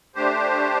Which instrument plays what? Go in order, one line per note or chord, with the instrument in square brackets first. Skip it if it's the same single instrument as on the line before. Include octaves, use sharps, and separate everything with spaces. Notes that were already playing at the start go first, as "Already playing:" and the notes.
[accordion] A3 D4 G4 C5